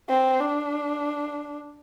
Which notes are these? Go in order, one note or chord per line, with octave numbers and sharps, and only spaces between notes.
C4
D4